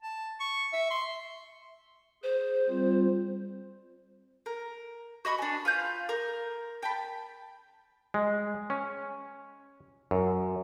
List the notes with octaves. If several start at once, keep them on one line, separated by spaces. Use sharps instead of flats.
A5
C#6
E5
C6
G#4 C5
G3 C4 F4
A#4
F#4 D#5 B5 C#6
D4 G#5
F4 B4 F5 G6
A#4
G5 A5 B5
G#3
C#4
F#2